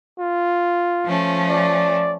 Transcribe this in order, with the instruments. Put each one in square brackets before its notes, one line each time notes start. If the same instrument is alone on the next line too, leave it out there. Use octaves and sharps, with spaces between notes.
[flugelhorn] F4
[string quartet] F3 A3 C#4
[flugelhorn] D5